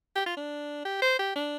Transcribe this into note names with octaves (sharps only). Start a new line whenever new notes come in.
G4
F4
D4
G4
C5
G4
D4